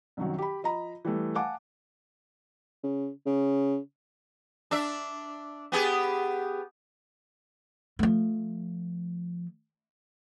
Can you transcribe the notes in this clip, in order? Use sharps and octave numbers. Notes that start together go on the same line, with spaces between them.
C2 F#2 D#3 F#3
G4 B5
F3 D#5 A#5 B5
E3 G3 A3
F5 F#5 G#5 A5 D6
C#3
C#3
D4 E5
B3 G4 G#4
F3 A3